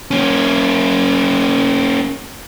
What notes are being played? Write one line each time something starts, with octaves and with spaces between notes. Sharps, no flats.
A#3 C#4